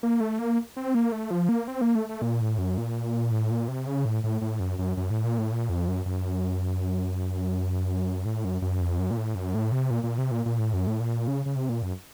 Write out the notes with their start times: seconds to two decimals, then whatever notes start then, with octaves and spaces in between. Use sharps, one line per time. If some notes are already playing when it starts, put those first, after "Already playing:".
0.03 A#3
0.20 A3
0.39 A#3
0.76 C4
0.95 A#3
1.12 A3
1.31 F3
1.49 A#3
1.68 C4
1.81 A#3
1.95 A3
2.09 A3
2.22 A#2
2.41 A2
2.58 F#2
2.78 A#2
3.31 A2
3.51 A#2
3.68 C3
3.87 C#3
4.05 A2
4.24 A2
4.42 A2
4.60 F#2
4.79 F#2
4.97 F#2
5.10 A2
5.24 A#2
5.38 A2
5.52 A#2
5.69 F2
5.88 F#2
6.06 F#2
8.25 A2
8.45 F#2
8.62 F#2
8.81 F2
8.99 F#2
9.11 A#2
9.17 A2
9.35 F#2
9.54 A2
9.72 C3
9.90 A#2
10.04 A#2
10.18 C3
10.31 A#2
10.46 A#2
10.59 A2
10.73 F#2
10.87 A2
11.00 A#2
11.28 C#3
11.46 C#3
11.56 C3
11.69 A#2
11.82 F#2